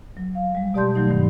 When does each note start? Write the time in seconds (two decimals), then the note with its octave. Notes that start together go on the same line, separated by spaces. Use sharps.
0.17 F#3
0.35 F5
0.55 G3 G#3
0.74 B2 G4 D5 A5 C6 G6
0.95 D#3 F#3 A3 D#4
1.10 G2 D#3 A3